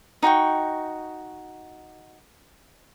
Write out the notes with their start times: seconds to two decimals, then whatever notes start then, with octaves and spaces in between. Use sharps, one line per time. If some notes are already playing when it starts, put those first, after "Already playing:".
0.23 D#4 F#4 G5 C#6